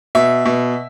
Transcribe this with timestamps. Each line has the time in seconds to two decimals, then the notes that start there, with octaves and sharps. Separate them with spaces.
0.15 B2 E5
0.45 B2